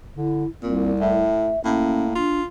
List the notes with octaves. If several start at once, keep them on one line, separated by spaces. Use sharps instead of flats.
D3 E4
C2 A#2 C4
A2 E5
A2 A#3 C#4
D4 F4